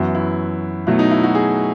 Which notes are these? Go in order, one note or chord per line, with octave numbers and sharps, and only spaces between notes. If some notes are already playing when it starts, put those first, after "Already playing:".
Already playing: F#2 E3 B3 F#4
E4
B2 F#3 A3 E4
D#4
E4
F#4
G#4